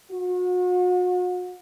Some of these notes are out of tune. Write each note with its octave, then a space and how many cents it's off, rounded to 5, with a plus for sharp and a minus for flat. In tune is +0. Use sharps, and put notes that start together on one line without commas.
F#4 -40